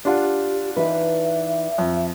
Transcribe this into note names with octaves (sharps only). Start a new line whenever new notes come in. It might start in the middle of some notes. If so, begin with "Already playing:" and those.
D4 F4 G4 F#5
E3 D#4 B4 E5
F2